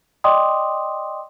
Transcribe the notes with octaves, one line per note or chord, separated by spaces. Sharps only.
D5 D#5 G5 C6 D6 D#6